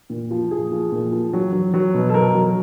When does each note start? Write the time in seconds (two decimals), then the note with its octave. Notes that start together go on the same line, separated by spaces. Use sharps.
0.10 A#2
0.31 F3
0.51 A#2 G#4
0.72 F3
0.92 A#2
1.12 F3
1.33 F#3
1.53 F#3
1.74 F#3
1.94 B2
2.09 A4
2.14 F#3 A#4
2.35 F#3